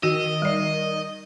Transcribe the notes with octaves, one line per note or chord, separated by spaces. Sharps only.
D#3 F#4 D#5
G3 D5